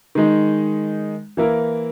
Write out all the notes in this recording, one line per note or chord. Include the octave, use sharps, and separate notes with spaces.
D#3 G#3 D#4
E3 A#3 E4 A#4